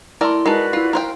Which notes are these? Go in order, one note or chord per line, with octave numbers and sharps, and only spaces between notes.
A3 E4 A#4 D5 C6
G#3 D#4 F#4 A#4 B4 D5 A5
E4 F4 F5
A#4 C5 G5